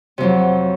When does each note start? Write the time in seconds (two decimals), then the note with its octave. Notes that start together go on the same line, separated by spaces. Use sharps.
0.18 C3
0.20 F2
0.23 F#3